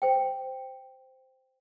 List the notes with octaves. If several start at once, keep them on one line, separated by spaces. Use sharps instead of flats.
C5 G5